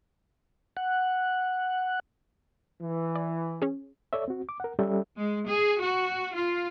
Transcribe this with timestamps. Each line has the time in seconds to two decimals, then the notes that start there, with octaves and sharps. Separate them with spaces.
0.77 F#5
2.82 E3
3.15 D5
3.62 C#4 G#4
4.13 A4 C#5 D5 E5
4.28 C4 F#4
4.49 D6
4.60 A#4 F#5
4.79 G3 C#4 A4 E5
5.17 G#3
5.48 G#4
5.79 F#4
6.34 F4